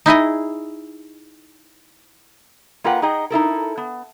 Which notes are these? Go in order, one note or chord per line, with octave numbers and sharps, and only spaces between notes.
D#4 E4 G#4 D#5
A#3 F4 A#4 B4 F#5 G5
D#4 G#4 D#5 G5
D#4 E4 A4 A#4
B3